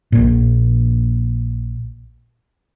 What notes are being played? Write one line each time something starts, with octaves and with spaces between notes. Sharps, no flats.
A#1 A#2